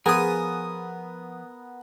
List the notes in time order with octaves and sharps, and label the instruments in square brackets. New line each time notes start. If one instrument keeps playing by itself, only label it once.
[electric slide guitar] F3 G#5 [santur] B3 [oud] G#4 [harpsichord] A#4 D#6